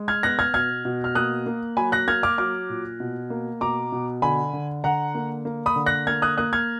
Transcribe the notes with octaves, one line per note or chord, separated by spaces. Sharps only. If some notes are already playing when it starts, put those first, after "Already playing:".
Already playing: G#3
F6 G#6
B3 F#6 A#6
F6 G#6
B2 F6 G#6
B2
F6
A#3 D#6 F#6
A#3
F#3 G#5 B5
F#6 A#6
A#3 F6 G#6
D6 F6
F#3 D6 F6
A#2
B2
A#3
B2 A#5 D6
B2
D3 G#5 B5
D3
D3 F#5 A#5
A#3
A#3
B5 D#6
D3
F#6 A#6
A#3 F6 G#6
D#6 F#6
A#3 D#6 F#6
F6 G#6